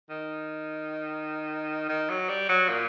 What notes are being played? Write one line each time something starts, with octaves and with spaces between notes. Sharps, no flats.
D#3
D#3
F#3
G3
F#3
A#2